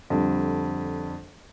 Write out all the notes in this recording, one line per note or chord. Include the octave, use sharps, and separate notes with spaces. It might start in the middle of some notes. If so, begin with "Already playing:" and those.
F2 D3 G3